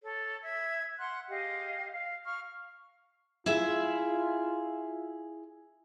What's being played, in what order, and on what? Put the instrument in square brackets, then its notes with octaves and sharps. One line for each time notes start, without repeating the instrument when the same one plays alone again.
[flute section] A4 C#5
E5 G#6
F#5 C6 F6 F#6
G4 G#4 D#5 F5
F5
F5 C#6 F6
[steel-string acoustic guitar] E4 G#4 E5 [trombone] F4